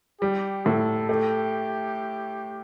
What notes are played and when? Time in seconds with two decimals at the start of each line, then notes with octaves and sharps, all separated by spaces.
0.21 G3 G4
0.65 A2 A4
1.09 A3 G4